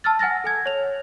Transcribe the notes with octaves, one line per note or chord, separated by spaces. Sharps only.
A5 E6 F6 A6
F#5 G#5 F6 A6 A#6
A4 G#5 G#6
C#5 F7